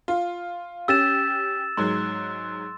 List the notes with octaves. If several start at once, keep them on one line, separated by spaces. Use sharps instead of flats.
F4
C#4 G4 E6 A6 E7
G#2 F#3 G#3 C6